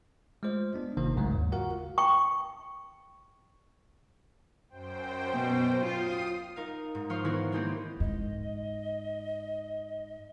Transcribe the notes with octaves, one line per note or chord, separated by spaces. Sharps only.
G#3 A3 F4 C5 D#5
B3 D4
G1 C3 D#3 A#3 C5
C2 G#2 C#3 F#3 G#3 A3
D#2
F4 F#4 A#4 F5 F#5
G5 C#6
F#2 C5 G5
B2
F4 D#6 C7 D#7
D#4 A#4 F5
G#2
F3 F4 C5 C#5 F5 F6
D#3 E3 B3 E4 G#4 A#4
G#3 A#3 C4 D#4 G4 G#4
G#2 D#5